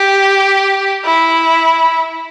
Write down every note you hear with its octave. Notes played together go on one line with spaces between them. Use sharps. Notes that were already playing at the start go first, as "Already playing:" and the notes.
Already playing: G4
E4